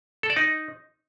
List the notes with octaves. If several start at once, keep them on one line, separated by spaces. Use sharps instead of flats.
A4
D5
D#4